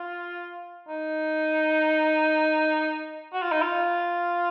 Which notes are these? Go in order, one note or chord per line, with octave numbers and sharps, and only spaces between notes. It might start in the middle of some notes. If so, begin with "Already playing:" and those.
Already playing: F4
D#4
F#4
F4
D#4
F4